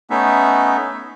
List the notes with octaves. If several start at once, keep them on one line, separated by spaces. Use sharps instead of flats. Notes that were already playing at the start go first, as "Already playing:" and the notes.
A3 B3 C#4 D#4 E5